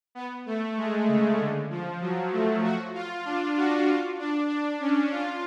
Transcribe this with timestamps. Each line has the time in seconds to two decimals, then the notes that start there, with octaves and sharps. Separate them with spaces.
0.15 B3
0.46 A3
0.77 G#3
1.08 C#3
1.39 D3
1.70 F3
2.01 F#3
2.32 A3
2.64 F#4
2.94 F4
3.25 D4
3.57 F#4
3.88 F4
4.19 D4
4.49 D4
4.81 C#4
5.12 F4